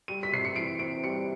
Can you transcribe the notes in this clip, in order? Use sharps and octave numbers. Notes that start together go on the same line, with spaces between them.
G3 D#7
B6
C3 C7
C#7
E3 D7
C4 D7
G3 C#7